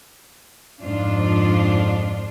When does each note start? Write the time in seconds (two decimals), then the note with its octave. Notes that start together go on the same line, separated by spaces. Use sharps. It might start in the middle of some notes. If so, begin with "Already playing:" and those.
0.81 F2 G#2 F3 D4 F4